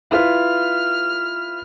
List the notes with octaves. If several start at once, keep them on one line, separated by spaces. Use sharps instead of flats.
E4 F4 B4 F6